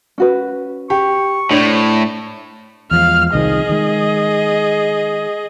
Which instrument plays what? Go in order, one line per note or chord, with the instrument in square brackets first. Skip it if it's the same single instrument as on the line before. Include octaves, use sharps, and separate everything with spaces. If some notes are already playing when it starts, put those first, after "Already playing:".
[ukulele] C#4 F#4 B4
[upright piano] G4 [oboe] C#6
[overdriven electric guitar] A2 [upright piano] D4 [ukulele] C5 C#5
[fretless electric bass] E2 F3 G#3 [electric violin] F5 F6
[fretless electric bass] C2 D#3 F3 [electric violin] G#4 D#5
[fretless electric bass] D#3 G#3